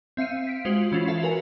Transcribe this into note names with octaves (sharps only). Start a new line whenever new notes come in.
C4 E5 F5 C#7 D#7
B6 D7
G#3 F4 F#4 C5 F#7
E3 C#4 E4 F4 A6 C7
A4 E5 F5
F#4 A#4 B4 G#5